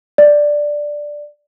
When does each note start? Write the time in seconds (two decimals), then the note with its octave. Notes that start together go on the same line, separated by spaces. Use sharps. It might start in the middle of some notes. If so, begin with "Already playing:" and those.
0.18 D5